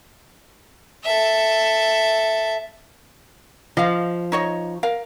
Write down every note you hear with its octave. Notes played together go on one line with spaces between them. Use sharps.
A4 E5
F3 D#5 F5
D#4 C#5 D#5
A#4 F5